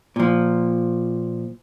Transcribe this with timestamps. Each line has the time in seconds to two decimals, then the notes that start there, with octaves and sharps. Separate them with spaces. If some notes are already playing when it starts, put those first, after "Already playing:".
0.16 A#2 F3